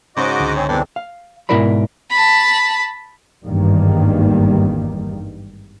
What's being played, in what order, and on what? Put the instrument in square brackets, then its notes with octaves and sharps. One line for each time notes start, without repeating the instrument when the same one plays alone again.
[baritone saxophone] G#2 [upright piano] C#3 [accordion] F#4 D#5 D6 [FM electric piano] C5 C#5
[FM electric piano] C#2 D3
[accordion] C4 G#4 [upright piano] C#5
[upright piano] B1 E2 [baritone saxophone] G2 [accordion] E3 C4 D4
[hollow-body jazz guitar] F5
G#2 B2 E4 A#4 D5 B5
[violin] A5 B5
[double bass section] G#1 E2 G2 D#3 G3 A#3